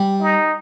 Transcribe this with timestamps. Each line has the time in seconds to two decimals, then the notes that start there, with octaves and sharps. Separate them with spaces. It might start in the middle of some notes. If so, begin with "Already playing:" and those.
Already playing: G3
0.21 D#4